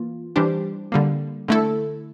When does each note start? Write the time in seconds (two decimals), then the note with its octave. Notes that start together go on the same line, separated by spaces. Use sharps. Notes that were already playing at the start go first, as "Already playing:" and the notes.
Already playing: E3 A#3 F4
0.36 E3 G3 D4 G4 C5
0.92 D3 G3 A#3
1.48 D3 A3 E4 A4